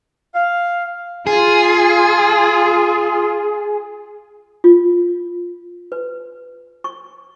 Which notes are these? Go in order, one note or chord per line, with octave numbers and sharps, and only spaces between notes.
F5
F4 G#4
F4
B4
C#6